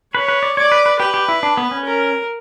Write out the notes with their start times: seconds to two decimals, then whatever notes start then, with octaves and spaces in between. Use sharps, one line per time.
0.14 B4 C#5
0.28 B4
0.43 D5
0.57 C#5 D5
0.72 B4
0.86 B4
1.00 G4 B4
1.14 G4
1.29 E4
1.43 D4
1.57 B3
1.71 C#4
1.85 A#4